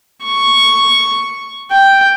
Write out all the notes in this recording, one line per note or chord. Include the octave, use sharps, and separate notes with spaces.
C#6
G5